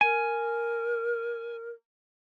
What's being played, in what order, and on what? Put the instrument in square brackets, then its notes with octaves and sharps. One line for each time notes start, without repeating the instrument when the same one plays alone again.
[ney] A#4 [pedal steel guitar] G#5